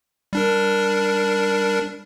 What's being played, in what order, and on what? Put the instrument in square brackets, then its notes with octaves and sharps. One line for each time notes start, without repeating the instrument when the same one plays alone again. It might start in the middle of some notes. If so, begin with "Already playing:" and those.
[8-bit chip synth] G3 D4 A#4